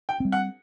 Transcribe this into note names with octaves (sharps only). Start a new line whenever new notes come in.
G5
G3 C4
F#5